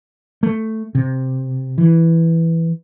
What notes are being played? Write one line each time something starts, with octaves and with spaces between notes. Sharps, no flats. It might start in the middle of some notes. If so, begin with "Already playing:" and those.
A3
C3
E3